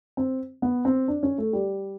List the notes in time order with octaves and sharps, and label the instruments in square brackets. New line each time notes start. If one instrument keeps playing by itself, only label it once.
[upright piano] C4
B3
C4
D4
C#4
A3
G3